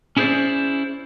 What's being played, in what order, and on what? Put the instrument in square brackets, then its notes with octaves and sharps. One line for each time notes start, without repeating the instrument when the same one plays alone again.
[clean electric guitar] C#4 E4 G#4 B4 C5 D5